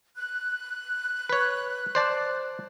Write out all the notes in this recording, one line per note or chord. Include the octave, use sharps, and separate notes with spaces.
F#6
B4 C#5
C5 D5 A5